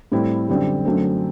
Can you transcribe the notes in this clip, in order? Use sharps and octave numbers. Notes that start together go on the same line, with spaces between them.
A2 G3 C4 E4
F#2 D3 G3 C4
F#2 D3 F#3 A3 C4